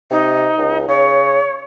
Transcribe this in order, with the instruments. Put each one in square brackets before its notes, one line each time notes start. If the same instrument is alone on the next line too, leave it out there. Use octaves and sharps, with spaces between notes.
[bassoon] C3 [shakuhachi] D#4
[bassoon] C#2
[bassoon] C#3 [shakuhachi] C#5